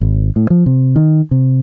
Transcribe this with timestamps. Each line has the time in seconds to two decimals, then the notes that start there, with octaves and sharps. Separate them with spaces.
0.01 G#1
0.36 A2
0.50 F3
0.66 C3
0.96 D#3
1.31 C3